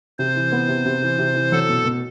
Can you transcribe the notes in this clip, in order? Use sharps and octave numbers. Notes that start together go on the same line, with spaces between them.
C3 C5
E3
B3
C3
C3
E3
C3
E3
F#3 A4
B2
B2